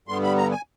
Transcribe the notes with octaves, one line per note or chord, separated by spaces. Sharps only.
G2 D3 G3 B3 C6
B5
A#5
G#5